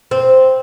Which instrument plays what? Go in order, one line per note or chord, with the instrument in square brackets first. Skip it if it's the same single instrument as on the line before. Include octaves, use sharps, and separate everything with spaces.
[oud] C4